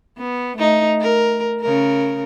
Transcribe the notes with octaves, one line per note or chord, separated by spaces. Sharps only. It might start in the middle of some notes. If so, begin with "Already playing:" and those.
B3
A3 D#4
A#4
C#3 A#4